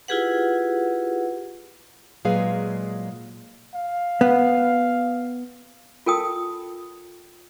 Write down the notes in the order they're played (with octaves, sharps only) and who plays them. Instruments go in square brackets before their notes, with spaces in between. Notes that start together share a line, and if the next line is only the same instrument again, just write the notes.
[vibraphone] E4 F4 G4 G#4 B4 F#5
[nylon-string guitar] A#2 F#3 G#3 G#4 B4 F5
[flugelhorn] F5
[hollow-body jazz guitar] B3
[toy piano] F4 A4 A#4 G5 A5 D#6